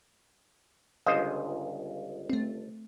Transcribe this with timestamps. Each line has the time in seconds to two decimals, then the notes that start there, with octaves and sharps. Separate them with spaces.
1.06 G1 C#2 C5 D#5 F5 D#6
2.30 A3 C4